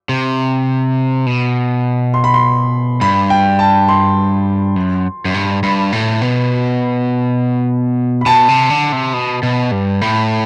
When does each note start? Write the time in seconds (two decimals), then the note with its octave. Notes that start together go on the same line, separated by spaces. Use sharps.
0.09 C3
1.26 B2
2.14 C6
2.24 B5
2.34 C6
3.01 G2 B5
3.30 G5
3.59 A5
3.88 C6
4.76 F#2
5.25 F#2
5.34 G2
5.63 G2 B5
5.92 A2
6.22 B2
8.21 B5
8.26 B2 A5
8.48 C3
8.70 D3
8.92 C3
9.14 B2
9.43 B2
9.72 G2
10.01 A2 B5